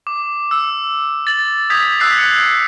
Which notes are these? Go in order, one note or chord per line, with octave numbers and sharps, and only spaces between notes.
D6
E6
A6 F#7
D#6 G6 G#6 B6 F7
D#6 E6 F#6 G6 B6 C7
F#6 C#7